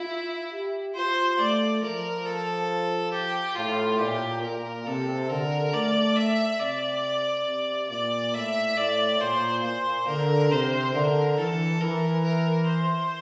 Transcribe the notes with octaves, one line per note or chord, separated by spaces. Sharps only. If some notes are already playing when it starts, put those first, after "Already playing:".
Already playing: E4 F4
G4
F4 C5
A3 D5
F3 A#4
A4
G4
A2 F4
A#2 G4
A#2 A#4
C3 A4
D3 A#4
A3 D5
E5
C3 D5
C3
A#2 D5
A2 E5
A2 D5
A#2 C5
A#2 C5
D3 A#4
C3 C5
D3 A#4
E3 A4
E3 A#4
A#4
C5